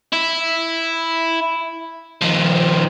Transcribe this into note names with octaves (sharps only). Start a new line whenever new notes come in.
E4
D#3 F3